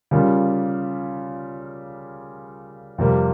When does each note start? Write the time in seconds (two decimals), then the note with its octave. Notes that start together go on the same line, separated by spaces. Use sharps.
0.11 C#3 G3 A#3 F4
2.98 F2 C3 G3 A#3